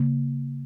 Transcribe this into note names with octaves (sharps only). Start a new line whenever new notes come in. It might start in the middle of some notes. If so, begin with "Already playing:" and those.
Already playing: C#3 A#3